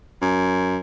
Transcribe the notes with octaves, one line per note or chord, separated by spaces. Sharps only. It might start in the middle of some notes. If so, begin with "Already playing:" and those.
F#2